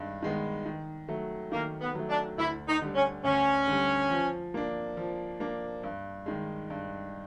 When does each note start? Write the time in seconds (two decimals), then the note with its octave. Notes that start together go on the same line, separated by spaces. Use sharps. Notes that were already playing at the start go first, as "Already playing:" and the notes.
Already playing: G2 D#3 G#3
0.22 D#3 G#3 B3
0.66 D#3
1.08 F#3 A3
1.52 D#3 A#3
1.81 B3
1.95 F#3 A3
2.09 D4
2.38 D2 E4
2.68 D#4
2.82 D3 G3
2.95 C#4
3.24 D2 C#4
3.67 D3 G3
4.10 F3
4.54 A#3 D4
4.97 F3
5.40 A#3 D4
5.83 G2
6.26 D#3 G#3
6.70 G2